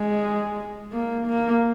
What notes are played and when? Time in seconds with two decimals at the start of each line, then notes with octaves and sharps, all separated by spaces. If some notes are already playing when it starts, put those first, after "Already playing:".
Already playing: G#3
0.92 A#3
1.27 A#3